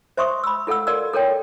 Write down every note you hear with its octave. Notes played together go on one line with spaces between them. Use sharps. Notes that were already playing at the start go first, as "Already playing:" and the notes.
C5 E5 C6 C#6 D#6
B5 E6
F4 A4 F5 F#5 E6
F#4 A4 A#4 D5 F5 E6
A4 A#4 C#5 G5